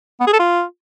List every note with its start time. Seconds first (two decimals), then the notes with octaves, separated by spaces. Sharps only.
0.20 B3
0.27 G#4
0.33 A4
0.40 F4